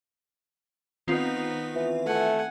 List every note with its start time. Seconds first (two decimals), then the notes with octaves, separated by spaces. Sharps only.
1.08 D#3 B3 C4 D#4 F4
1.75 E3
2.06 A3 F#5 G#5